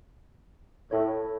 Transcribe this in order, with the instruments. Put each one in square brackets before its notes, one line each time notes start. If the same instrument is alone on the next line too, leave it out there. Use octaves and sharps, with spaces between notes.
[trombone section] A2 [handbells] E4 A4 C#5